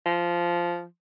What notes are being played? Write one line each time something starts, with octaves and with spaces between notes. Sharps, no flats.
F3